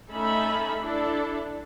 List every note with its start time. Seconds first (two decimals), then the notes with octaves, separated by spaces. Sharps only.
0.11 A3 C#4 D#4 A4 E5 B5
0.81 D4 E4 A4